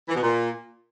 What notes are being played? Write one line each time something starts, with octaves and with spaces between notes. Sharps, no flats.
E3
B2
A#2